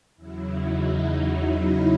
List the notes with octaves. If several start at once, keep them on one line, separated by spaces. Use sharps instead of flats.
E2 C#3 F#3 E4
D#4